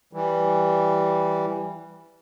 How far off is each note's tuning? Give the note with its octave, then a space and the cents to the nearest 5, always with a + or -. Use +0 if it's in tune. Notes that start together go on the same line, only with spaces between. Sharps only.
E3 +0 G3 +0